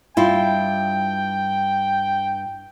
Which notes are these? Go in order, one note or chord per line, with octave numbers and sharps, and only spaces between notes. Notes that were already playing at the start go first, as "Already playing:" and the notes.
G2 E4 F4 G5